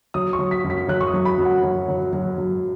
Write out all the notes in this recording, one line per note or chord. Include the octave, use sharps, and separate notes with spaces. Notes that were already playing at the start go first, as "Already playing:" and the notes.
F#3 D#6
C#6
F#3
B6
F#2
B6
F#3 F#6
C#6
D#6
F#3
B5
F#2
F#5
F#3
F#3
F#3
F#3